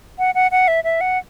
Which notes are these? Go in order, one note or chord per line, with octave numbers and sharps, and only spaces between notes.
F#5
F#5
F#5
E5
E5
F#5